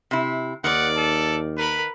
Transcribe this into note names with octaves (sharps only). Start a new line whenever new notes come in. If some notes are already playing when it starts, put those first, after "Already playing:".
C3 E4
D#2 D#3 D5 F#5
A4
A#4 B4 B5